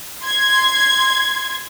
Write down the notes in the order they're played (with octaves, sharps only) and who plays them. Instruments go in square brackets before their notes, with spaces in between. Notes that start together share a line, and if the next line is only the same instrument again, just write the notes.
[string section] C6 G#6